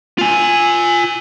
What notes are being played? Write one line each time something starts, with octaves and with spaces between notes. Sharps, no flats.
F4 G#5